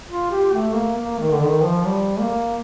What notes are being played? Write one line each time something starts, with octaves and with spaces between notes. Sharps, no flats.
F4
G4
A3
A#3
A#3
D#3
D3
D#3
F3
G3
A#3